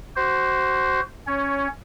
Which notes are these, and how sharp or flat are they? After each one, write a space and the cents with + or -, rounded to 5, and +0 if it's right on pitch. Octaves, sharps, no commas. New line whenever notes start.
F#4 +25 C5 +0
C#4 +0 C#5 +15